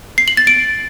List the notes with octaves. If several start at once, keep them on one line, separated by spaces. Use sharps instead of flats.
C7
F#7
A6
D7